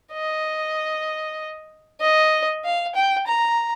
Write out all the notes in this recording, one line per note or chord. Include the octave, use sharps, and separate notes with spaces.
D#5
D#5
F5
G5
A#5